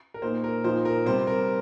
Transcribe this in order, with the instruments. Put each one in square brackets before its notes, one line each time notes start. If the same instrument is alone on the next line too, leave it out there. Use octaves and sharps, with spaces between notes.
[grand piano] A#4
A#2 A#3 D#4 C5
A#4
A#2 F3 D#4 C5
A#4
C3 G3 C4 C5
A#4